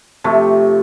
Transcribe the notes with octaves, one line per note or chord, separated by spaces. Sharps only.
C3 F3 A3